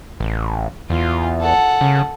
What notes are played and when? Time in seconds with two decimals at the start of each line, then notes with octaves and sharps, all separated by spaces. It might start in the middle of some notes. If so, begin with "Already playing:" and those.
0.20 A1
0.90 E2 F4
1.41 A4 F#5
1.81 C#3